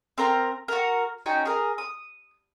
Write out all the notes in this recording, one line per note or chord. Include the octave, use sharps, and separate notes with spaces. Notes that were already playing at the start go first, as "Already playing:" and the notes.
C4 A#4 A#5
F#4 A#4
C#4 D#4 F#4 G5
G#4 A#4
D#6